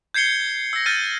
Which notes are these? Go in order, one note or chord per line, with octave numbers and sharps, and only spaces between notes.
G6 G#6 C7 C#7 G7
E6 A#6
F6 G6 A6 D#7